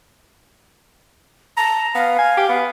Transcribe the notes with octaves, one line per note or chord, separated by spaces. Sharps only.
A5 A#5
B3 F5
G#5
G4
B3